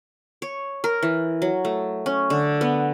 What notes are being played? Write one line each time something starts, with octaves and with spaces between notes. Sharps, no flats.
C#5
A#4
E3
F#3
A3
C#4
D3
B3